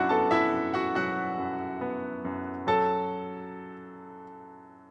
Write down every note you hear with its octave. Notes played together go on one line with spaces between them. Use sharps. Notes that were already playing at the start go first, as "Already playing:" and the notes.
Already playing: F#2 F#3 D4 E4 F#4 F#5
B3 A4 A5
E4 E5
F#2
F#4 F#5
F#3 F#4 F#5
F#2
B3
F#2
F#3 A4 A5